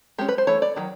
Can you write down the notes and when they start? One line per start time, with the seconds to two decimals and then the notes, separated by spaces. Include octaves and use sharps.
0.18 G#3 C#4 G4
0.28 B4
0.38 C5
0.47 E3 A3 C#5
0.62 D5
0.76 D#3 F#3